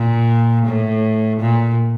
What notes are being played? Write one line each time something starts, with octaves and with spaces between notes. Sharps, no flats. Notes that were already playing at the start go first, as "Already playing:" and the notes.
Already playing: A#2
A2
A#2